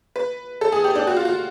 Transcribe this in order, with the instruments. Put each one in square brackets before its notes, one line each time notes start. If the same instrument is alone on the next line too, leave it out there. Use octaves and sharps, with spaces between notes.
[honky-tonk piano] B4
A4
G#4
G4
D4
F#4
F4
F#4